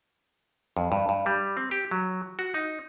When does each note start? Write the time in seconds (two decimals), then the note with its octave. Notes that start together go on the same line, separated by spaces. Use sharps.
0.77 F2
0.92 G2
1.09 G2
1.26 G3
1.57 C4
1.71 G4
1.91 F#3
2.39 F#4
2.54 D#4